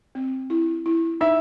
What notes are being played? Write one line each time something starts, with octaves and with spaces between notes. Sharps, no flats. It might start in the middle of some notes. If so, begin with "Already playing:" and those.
C4
E4
E4
D#4 E5